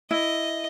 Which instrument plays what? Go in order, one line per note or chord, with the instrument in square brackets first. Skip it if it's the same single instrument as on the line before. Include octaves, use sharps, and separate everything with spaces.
[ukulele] E4 [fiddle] D#5